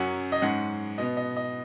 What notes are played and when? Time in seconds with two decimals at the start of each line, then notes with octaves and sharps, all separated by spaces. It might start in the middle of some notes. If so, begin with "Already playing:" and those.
Already playing: F#2 F#3 C#4 F#5
0.32 D#5
0.42 G#2 G#3 C#4 F#5
0.98 B2 B3 D#5
1.17 D#5
1.37 D#5